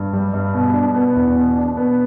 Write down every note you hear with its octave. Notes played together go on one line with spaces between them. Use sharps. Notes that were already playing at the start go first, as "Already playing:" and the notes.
Already playing: G2
G3
G2
B2
D4
B3
E2
B2
D4
B3